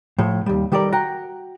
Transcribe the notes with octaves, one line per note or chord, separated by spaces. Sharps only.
A2 F3
D#2 G3
D#3 G3 G4 A4 A#4 D5
F#4 G5 A#5